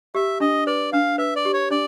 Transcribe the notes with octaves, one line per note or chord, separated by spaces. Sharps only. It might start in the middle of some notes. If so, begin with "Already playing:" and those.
G4 E5
D4 D#5
B4 D5
D4 F5
B4 E5
D5
G4
C#5
D4 D5